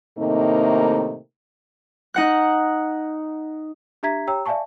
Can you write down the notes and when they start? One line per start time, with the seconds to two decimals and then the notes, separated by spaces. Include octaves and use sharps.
0.19 A2 C3 D#3 A3 A#3 D#4
2.14 D#4 F#5 F#6
4.03 D4 G4 E5 A#5 G#6 B6
4.27 G4 C#5 G5 A#5 E6
4.46 D5 E5 F5 G#5 A5 C#6